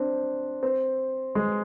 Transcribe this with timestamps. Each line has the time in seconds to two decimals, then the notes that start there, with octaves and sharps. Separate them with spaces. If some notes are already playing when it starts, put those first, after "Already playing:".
Already playing: C4 D4
0.63 C4
1.35 G#3